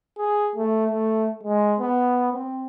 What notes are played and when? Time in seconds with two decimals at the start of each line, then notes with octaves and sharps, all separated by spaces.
0.18 G#4
0.56 A3
0.91 A3
1.43 G#3
1.79 B3
2.33 C4